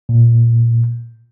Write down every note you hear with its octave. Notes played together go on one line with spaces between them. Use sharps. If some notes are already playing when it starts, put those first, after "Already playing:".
A#2